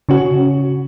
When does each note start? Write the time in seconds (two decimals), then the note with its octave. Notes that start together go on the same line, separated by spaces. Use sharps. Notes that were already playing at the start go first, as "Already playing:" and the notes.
0.09 C#3 C#4 F#4